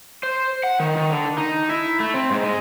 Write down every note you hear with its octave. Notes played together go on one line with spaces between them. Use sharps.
C5
F#5
D#3
D#3
D3
D#4
E4
A3
C4
G#2
G#3